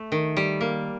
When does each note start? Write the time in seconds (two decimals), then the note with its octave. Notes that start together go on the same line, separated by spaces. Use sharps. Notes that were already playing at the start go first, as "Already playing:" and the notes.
Already playing: A3
0.12 D#3
0.37 G3
0.61 A#3